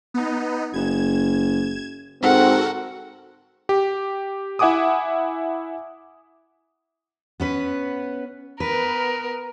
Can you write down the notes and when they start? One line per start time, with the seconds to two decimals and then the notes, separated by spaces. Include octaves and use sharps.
0.14 B3 D#4
0.73 F#1 G#6 E7
2.22 G#2 C4 F#4 A4 A#4 F#5
3.69 G4
4.59 E4 E5 F#5 G#5 D6 D#6
7.40 B3 C#4 B4
8.60 B3 A#4 B4